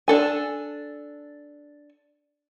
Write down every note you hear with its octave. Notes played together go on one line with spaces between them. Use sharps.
D4 A4 G#5